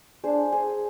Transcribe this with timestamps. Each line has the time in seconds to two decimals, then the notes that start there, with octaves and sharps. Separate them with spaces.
0.24 D4 G#4 C5
0.52 G#4 C5